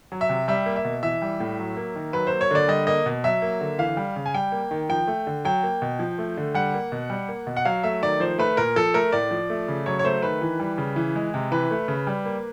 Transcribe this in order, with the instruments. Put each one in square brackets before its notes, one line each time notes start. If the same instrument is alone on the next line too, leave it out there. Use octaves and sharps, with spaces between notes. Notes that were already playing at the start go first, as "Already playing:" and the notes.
[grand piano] F#3
E5
C3
G3 E5
A#3
E5
B2
E3 E5
G3
A2
F#3
A#3
D#3
F#3 B4
A#3 C5
C#5
D3 D5
G3 D#5
A#3 D#5
B2
F#3 E5
A#3
D3
E3 F5
G3
C#3
G#5
G3 G5
A#3
D#3
F3 G5
A3
D3
F#3 G5
A#3
B2
F3
A3
D3
G3 F#5
A#3
B2
G3
A#3
B2
F#5
F#3 F5
A3 E5
D#3 D5
F3 C5
A3 B4
A#2 A#4
F3 A4
A3 A#4
A2 D5
F3
A3
C#3
F#3 C#5
C#5
A3 C5
D#3 B4
E3
G3
C#3
E3
G#3
C3
E3 B4
A3
C#3
G3
A#3